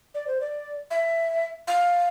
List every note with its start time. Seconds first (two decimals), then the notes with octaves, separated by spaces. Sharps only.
0.14 D5
0.27 C5
0.40 D5
0.90 E5
1.67 F5